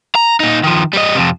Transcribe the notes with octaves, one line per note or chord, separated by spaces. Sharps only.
A#5
A#2 D#4
D#3 F3
G3 D#5
F2 C3